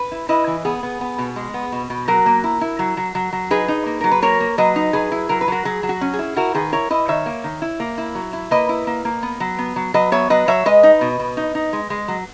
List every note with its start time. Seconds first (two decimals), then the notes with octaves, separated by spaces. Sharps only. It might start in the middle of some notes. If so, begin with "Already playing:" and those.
Already playing: B4
0.12 E4
0.29 E4 B4 D#5
0.47 E3
0.65 B3 G#4
0.83 B3
1.01 B3
1.18 B2
1.36 G#3
1.54 B3
1.72 B2
1.90 B2
2.08 F#3 F#4 A#4
2.26 A#3
2.44 E4
2.61 E4
2.79 F#3
2.97 F#3
3.15 F#3
3.33 F#3
3.51 D#4 G#4 B4
3.68 D#4
3.86 A#3
4.01 F#3 A#4
4.11 B4
4.22 A#3 A#4 C#5
4.40 A#3
4.58 F#3 B4 D#5
4.76 D#4
4.93 F#3 G#4 B4
5.12 E4
5.29 F#3 A#4
5.41 B4
5.48 F#3 F#4 A#4
5.65 F#3 G#4
5.83 F#3
5.89 F#4
6.01 C#4
6.14 G#4
6.19 E4
6.36 E4 F#4 A#4
6.54 D#3 G#4 B4
6.72 E4 A#4 C#5
6.90 E4 B4 D#5
7.08 D#3 C#5 E5
7.26 A#3
7.44 D#3
7.62 E4
7.80 A#3
7.98 E4
8.15 F#3
8.33 E4
8.51 A#3 B4 D#5
8.69 E4
8.87 A#3
9.05 A#3
9.23 B3
9.40 F#3
9.59 B3
9.76 F#3
9.94 F#3 B4 D#5
10.12 B3 C#5 E5
10.30 F#3 B4 D#5
10.48 F#3 C#5 E5
10.66 G#3 B4 D#5
10.83 D#4
11.01 B2
11.19 B2
11.37 D#4
11.55 D#4
11.73 G#3
11.90 G#3
12.08 F#3